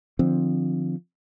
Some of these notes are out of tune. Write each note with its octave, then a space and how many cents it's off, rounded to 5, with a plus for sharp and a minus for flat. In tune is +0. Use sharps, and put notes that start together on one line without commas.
D3 +30 F3 +0 C4 +0